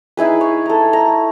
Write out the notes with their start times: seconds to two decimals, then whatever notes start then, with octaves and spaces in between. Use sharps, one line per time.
0.17 D#4 E4 G#4 B4
0.41 C#5
0.66 A4 A#5
0.93 A#5